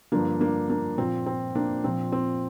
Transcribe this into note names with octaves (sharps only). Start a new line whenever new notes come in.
G2 D3 F3 A#3 D4
A#3 D4
A#3 D4
A#2 F3 C4
C4
A#3 D4
A#2 F3 C4
C4